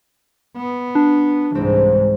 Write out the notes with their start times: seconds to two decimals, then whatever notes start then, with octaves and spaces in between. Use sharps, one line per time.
0.57 B3
0.95 D4
1.55 C2 G#2 E3 C4